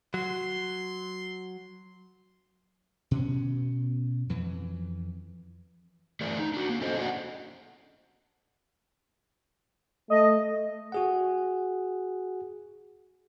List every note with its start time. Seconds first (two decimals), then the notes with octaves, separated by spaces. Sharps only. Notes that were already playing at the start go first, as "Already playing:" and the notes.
0.14 F#3 C6
3.11 B2 C#4
4.29 F2 E3
6.21 E3 A3 G#4 A#4 D5
6.39 D#4
6.54 D4 F#4
6.70 A#3
6.81 C#4 A4 C5 D#5
6.97 A3 D4 F#4 G#4 D5 F#5
10.10 A3 D#5
10.92 F#4 G#4 F#5